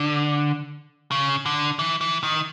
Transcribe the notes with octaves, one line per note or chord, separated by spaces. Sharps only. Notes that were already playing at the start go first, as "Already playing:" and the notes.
Already playing: D3
C#3
D3
E3
E3
D#3